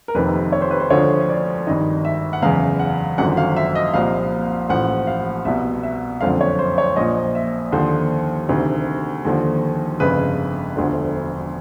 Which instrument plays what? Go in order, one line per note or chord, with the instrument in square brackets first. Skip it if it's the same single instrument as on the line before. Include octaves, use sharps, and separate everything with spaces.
[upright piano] A#4
F1 F2 C3 D#3 B4
C#5
C5
B4
C5
D2 D3 F3 C#5
D5
G#1 G2 D#3 D#5
E5
F#5
F#1 E2 C#3 F5
F#5
G#1 F#2 D3 F3 F#5
F5
E5
D#5
C2 A#2 F3 F5
A1 A2 F3 F#5
F5
C2 B2 E5
E5
F#1 F2 D3 F3 F5
C#5
C5
C#5
A#1 A#2 F3 D#5
E5
D#2 D3 F3 C5
D2 C3 D#3
D#2 D3 F3
G1 F2 C#3 B4
E1 D2 D3 F3